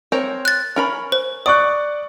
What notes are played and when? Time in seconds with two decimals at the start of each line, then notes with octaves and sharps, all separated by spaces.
0.12 C4 A#4 C#5
0.45 F#6 A6
0.76 C#4 A#4 B5
1.12 C5
1.46 D5 C#6 D#6 F#6